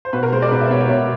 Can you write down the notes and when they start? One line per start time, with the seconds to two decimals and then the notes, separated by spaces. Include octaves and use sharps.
0.05 C5
0.13 B2 B4
0.23 A#4
0.32 G#3 C5
0.42 D5
0.51 B2 B4
0.61 E5
0.71 B2 C#5
0.81 C#5
0.90 B2